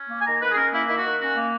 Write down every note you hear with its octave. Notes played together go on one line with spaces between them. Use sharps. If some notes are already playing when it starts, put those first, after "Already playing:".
Already playing: C#4
A#3
G#5
D#3 A#5
D#3 B4
G#4
C#4 A#4
A#3 E4
D#3 E4
F#4
D#3
C#4 F#4
A#3